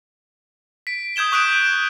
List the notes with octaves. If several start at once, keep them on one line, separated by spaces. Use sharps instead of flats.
B6 D7
D#6 G6 G#6 E7 G7
C#6 D#6 F#6 G6 D7 E7